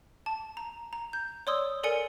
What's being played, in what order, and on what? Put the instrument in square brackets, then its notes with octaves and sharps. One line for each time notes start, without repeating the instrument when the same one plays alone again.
[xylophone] A5
A#5
A#5
G6
C#5 D5 C6 D#6 E6
A4 A#4 D5 G#5 C#7